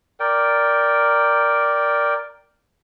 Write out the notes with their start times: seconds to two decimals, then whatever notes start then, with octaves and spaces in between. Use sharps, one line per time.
0.20 A#4 D5 G5